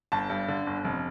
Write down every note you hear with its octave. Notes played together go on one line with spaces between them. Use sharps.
G1 A5
G2
D3
G1
F1